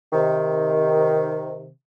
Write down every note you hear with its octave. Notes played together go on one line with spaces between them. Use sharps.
C3 D#3